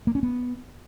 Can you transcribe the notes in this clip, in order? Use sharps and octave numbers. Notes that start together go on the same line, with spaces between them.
A#3
C#4
B3